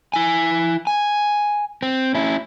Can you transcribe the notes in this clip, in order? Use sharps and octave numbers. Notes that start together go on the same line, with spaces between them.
E4 G#5
G#5
C4
C#4 E4